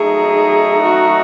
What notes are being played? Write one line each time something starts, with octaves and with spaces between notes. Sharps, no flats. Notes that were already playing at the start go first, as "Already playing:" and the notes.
Already playing: F#3 A3 D#4 G#4
F#4